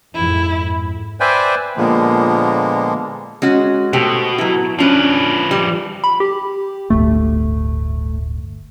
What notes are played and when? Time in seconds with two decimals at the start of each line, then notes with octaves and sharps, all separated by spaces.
0.15 F2 G#2 E4
1.20 B4 C5 D5 E5 G5 G#5
1.77 A#2 D3 F3 G#3 A#3 B3
3.42 G#3 C#4 F#4
3.93 B2 A3 G4 C5
4.38 F#3 E4
4.79 F3 C#4 D4 B4
5.51 G3
6.04 B5
6.20 G4
6.90 D1 G1 D2 A3